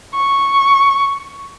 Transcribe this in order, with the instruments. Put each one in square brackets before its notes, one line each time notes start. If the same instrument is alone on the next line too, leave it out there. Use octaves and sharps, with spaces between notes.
[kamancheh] C#6